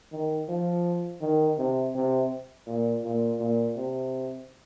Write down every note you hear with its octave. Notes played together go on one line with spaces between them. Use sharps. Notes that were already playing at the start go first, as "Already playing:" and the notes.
D#3
F3
D#3
C3
C3
A#2
A#2
A#2
C3